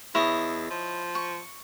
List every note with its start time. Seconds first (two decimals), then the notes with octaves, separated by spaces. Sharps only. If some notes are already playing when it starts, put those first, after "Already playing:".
0.15 E2 E4 C#5 D#5
0.71 F3
1.15 C#6